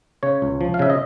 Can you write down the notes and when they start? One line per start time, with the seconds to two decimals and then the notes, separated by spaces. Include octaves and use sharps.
0.23 C#3 C#5
0.42 C#2
0.61 F3
0.74 F5
0.79 C#3 E5
0.90 D#5